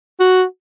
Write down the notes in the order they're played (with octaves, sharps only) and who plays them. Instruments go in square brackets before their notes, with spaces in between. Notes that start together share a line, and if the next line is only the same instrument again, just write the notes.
[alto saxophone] F#4